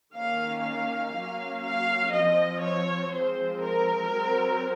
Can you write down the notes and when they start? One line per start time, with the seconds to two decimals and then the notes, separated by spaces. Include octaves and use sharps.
0.15 D#3 A#3 C#4 F5
0.64 F5
1.13 F#3 A#3 C#4
1.63 F5
2.12 F3 C4 D#5
2.63 C#5
3.12 F3 G#3 C4 C5
3.61 A#4
4.11 F#3 C4